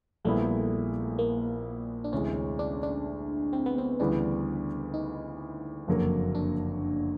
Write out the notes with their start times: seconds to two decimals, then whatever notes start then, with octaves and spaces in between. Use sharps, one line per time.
0.25 A#1 A#2 G3 A3 B3 E4
1.19 A#3
2.04 D4
2.12 D2 C3 E3 G#3 C#4
2.59 D4
2.83 D4
3.53 C4
3.66 B3
3.78 C4
4.00 D2 C#3 E3 G3 B3 D4
4.94 D#4
5.88 F#1 F2 D3 F#3 A#3
6.35 D4